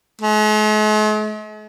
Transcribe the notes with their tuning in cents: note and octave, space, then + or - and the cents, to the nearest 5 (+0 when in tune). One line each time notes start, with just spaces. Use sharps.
G#3 +45